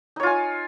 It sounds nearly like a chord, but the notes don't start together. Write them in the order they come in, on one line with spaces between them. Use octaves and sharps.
D#4 C#5 F4 G#5